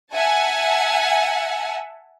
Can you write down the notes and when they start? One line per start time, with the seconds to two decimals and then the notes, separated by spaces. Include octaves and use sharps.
0.14 E5 F#5 G#5 A5